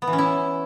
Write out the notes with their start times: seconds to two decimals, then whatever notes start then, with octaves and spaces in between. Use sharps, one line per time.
0.02 B3
0.07 E3
0.13 C#4
0.18 E4